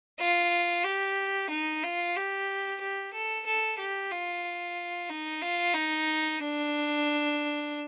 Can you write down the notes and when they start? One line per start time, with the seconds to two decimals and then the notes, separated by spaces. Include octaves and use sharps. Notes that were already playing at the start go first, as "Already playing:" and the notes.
0.19 F4
0.84 G4
1.50 D#4
1.83 F4
2.16 G4
2.81 G4
3.13 A4
3.46 A4
3.79 G4
4.11 F4
5.10 D#4
5.41 F4
5.74 D#4
6.40 D4